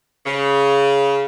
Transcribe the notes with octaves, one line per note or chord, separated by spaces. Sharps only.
C#3